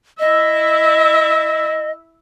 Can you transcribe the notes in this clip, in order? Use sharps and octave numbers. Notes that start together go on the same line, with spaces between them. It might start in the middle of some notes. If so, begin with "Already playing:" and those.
E4 D#5 E5